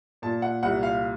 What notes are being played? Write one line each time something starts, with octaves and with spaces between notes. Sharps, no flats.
A#2 A5
F#5
C2 F#5
F5